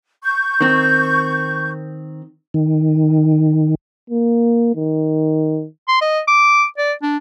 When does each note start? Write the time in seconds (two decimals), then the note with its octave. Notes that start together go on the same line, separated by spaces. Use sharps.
0.23 C#6 G6
0.61 D#3 C4
2.54 D#3
4.10 A#3
4.76 D#3
5.88 C6
6.01 D#5
6.28 D6
6.78 D5
7.02 D4